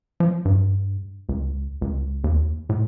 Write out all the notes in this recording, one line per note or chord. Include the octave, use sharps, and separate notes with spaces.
F3
G2
C#2
C#2
D#2
A2